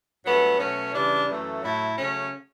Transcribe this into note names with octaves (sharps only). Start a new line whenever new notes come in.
G2 F#3 A3 B3
B2 F#3 A3 C#4
C#3 E3 G3 D4
F#2 E3 A3
A2 F#3 A3 E4
C#3 F#3 A3 C#4